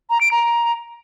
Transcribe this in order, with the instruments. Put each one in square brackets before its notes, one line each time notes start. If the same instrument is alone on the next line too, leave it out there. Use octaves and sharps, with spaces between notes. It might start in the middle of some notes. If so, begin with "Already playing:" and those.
[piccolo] A#5
D7
A#5